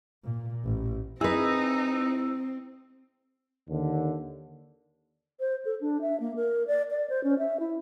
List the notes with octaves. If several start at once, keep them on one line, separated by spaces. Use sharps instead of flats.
A#2
A1
C4 D#4 E4 G#4 B4 E6
D#2 D3
C5
A4
D4
E5
A#3
A#4
D5
D5
C5
C#4
E5
E4